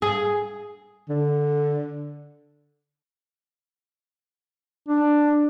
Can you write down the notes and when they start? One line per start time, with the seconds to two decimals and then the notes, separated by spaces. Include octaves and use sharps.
0.02 G#4
1.09 D3
4.88 D4